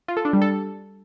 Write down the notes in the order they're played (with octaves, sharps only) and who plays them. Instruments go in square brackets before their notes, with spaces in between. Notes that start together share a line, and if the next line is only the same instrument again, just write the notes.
[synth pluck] F4
A4
D4
G3
A4